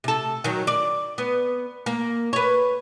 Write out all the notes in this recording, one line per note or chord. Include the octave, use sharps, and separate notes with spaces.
C3 A4
D#3 F#3
D5
B3
A#3
B4 C#5